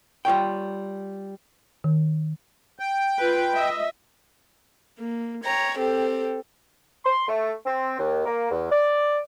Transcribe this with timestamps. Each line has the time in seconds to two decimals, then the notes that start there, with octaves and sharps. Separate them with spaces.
0.25 G3 F4 C#5 G5
1.84 D#3
2.79 G5
3.19 F4 B4
3.53 D#5 E5
4.98 A#3
5.44 C#5 G5 A#5
5.78 C4 G4 A4
7.05 C6
7.27 A3
7.66 C4
7.99 D#2
8.26 A#3
8.51 E2
8.70 D5